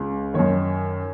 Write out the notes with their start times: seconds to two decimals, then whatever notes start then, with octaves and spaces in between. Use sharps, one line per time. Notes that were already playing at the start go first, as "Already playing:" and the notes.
Already playing: C#2 C#3
0.34 F#2 D#3 C#5